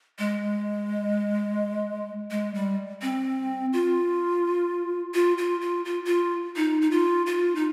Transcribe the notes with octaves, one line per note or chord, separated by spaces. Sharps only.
G#3
G#3
G3
C4
F4
F4
F4
F4
F4
F4
D#4
D#4
F4
F4
D#4